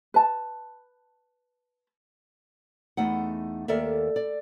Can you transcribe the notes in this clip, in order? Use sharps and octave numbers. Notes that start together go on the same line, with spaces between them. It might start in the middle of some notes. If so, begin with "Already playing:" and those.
B4 A5
E2 A3 D#4 F#5
D#2 A4 A#4 D5 E5
D5